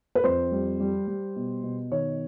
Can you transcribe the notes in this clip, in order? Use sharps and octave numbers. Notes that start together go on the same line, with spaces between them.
B4
F2 C5
G3
G3
G3
B2
B2
D#3 C#5